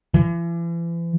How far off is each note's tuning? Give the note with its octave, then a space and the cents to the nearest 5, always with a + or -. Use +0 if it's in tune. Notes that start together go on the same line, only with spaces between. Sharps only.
E3 +40